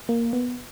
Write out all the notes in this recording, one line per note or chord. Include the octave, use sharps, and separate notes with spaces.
A#3
B3